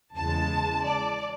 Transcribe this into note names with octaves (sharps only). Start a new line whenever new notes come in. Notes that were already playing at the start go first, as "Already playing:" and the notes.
E2 C#3 E3 G#3 A5
D5